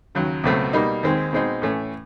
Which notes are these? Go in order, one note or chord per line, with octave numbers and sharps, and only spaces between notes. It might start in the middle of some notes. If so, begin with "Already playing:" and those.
D#2 C#3 F#3
C#2 B2 F#3 A3 C4
B2 G3 A#3 D#4
D#2 D#3 G#3 C4
B2 G#3 C4 D#4
A2 E3 A3 C#4